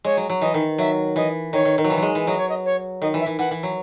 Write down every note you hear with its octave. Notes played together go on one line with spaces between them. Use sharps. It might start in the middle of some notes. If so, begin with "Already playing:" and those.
G#3 C#5
F#3
F#3
E3 D#5
D#3
F#3 E5
E3 D#5
D#3 C#5
D#3
D#3
F#3
E3
F#3 G#3
E3
F#3 D#5
C#5
D#5
C#5
D#3 D#5
E3
E5
E3
E3 F#5
E3
F#3